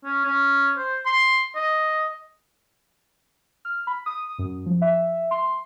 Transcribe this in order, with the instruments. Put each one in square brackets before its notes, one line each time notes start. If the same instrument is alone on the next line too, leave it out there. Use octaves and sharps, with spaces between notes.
[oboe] C#4
C#4
C5
C6
D#5
[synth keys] F6
B5
D#6
F#2
F3
E5
C6